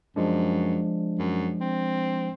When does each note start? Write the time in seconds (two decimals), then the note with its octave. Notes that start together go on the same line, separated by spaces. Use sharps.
0.16 F#2 F3 G#3 D4
1.19 F#2
1.61 C4